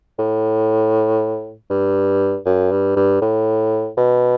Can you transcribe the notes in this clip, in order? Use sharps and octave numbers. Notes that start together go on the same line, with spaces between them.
A2
G2
F#2
G2
G2
A2
B2